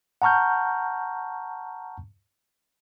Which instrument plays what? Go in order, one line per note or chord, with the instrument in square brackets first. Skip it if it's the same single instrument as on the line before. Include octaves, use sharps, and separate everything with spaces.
[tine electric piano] F#5 A5 A#5 C#6 F6 G6